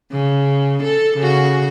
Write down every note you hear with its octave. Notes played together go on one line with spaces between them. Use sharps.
C#3
A4
C#3 F#4